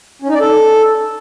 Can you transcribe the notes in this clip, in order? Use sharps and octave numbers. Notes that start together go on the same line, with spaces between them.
C#4
D#4
D5
A4